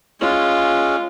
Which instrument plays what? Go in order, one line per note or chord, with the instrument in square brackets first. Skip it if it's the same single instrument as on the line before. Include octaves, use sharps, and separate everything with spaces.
[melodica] G#3 C#4 [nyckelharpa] F4